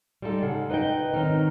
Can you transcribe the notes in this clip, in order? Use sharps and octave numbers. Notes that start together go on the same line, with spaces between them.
G3 G#3 D#4 E4 A4
G#2 C#3 F#5
D#4 B4 D5 D#5 G5
G#2 D#3 C4 C#4 D#4